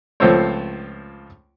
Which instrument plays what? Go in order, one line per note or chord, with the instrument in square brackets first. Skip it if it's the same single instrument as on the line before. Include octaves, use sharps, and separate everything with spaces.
[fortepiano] C#2 F3 A3 C4 C5 C#5